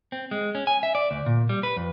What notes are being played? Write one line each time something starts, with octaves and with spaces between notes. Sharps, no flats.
C4
G#3
C#4
G#5
E5
D5
D2
A#2
G3
B4
F2